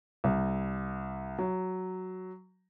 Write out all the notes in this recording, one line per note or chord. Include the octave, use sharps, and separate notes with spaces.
C2
F#3